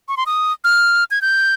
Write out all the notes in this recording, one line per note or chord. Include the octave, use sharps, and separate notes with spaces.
C#6
C6
D#6
F6
G#6
G6